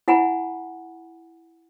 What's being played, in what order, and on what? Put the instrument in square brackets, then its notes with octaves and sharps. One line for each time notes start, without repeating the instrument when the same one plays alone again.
[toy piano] E4 F#5 G#5 B5